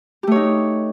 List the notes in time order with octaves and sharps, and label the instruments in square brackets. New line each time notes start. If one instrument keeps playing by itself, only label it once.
[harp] G4
A3
C#5
D#4